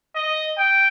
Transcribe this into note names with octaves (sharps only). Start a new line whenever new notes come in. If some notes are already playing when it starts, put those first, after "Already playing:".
D#5
G5